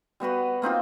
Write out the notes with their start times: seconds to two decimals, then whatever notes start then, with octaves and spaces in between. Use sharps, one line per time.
0.20 G3 B3 F#4 B4
0.62 A#3 C4 D#4 F4